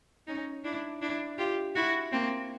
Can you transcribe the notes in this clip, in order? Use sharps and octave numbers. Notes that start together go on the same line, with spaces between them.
C#4 D#4
D4 E4
D4 E4
F4 G4
E4 F#4
A#3 C4